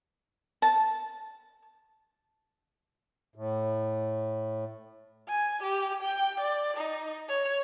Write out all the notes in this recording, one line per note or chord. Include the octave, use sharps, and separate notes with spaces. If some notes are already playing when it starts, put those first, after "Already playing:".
A5
A2
G#5
G4
G5
D5
D#4
C#5